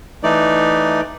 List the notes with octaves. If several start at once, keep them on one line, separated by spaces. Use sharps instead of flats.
E3 A3 D#4 D5